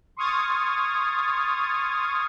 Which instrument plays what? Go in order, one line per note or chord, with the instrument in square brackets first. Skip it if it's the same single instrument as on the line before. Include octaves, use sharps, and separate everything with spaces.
[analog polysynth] C6 C#6 D#6 F6 G#6 A6